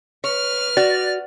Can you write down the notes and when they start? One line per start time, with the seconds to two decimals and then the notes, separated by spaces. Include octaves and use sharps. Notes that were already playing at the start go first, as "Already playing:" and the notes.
0.24 B4 C#5 F6
0.77 F#4 D5